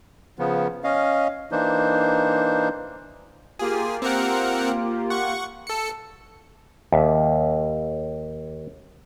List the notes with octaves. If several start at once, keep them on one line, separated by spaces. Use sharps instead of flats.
C#3 F3 B3
C#4 D#5 F5
E3 A#3 D4 D#4 C5
A#3 F4 G4 G#4
C4 A#4 F#5
F#5 C#6
A4 C#7
D#2 E5